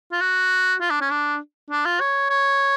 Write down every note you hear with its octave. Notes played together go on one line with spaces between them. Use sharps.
F4
F#4
F4
D4
C#4
D4
D4
F4
C#5
C#5